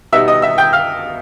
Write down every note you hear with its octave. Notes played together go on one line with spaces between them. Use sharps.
B2 G3 B3 D#4 E5 E6
D#5 D#6
E5 E6
G5 G6
F5 F6